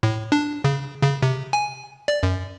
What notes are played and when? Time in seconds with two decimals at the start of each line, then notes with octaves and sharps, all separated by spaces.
0.03 A2
0.32 D4
0.64 C#3
1.03 C#3
1.22 C3
1.53 G#5
2.08 D5
2.23 F#2